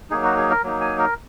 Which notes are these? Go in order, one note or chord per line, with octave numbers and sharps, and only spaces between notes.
F#3 A#3 D#4 G#4
F#4
G#4
A#4
F#3 A#3 D#4
G#5
A#4